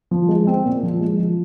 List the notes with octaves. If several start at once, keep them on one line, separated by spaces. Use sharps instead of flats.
F3
G#3
C4
A#2
F3
G#3
F3